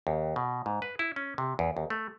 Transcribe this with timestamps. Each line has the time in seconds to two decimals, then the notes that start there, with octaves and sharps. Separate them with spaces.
0.07 D#2
0.36 B2
0.66 G#2
0.82 B4
0.99 E4
1.16 C#4
1.38 C3
1.59 E2
1.77 D#2
1.90 A3